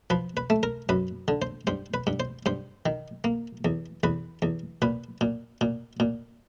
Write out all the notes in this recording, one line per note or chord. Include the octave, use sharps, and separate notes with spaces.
F3 B4
B4
A3
A#4
F#2 B4
D3
C5
G2 C5
B4
G2
C5
G2 C5
D#3
A#3
E2
E2 B4
E2
A#2 B4
A#2
A#2
A#2